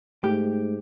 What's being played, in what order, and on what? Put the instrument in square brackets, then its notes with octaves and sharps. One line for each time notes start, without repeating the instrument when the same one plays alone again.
[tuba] G#2 [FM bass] A3 [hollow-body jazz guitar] G4